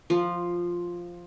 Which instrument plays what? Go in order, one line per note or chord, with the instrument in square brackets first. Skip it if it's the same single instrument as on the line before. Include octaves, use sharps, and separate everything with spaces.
[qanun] F3